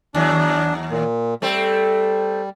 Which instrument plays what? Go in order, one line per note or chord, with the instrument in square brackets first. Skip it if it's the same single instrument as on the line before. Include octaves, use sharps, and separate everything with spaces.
[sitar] D#2 F#3 [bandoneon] D4
[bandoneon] A#2
[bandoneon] G3 [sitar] A3 C4